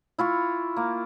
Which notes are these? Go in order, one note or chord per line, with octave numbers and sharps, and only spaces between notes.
E4 F4 C#6
A#3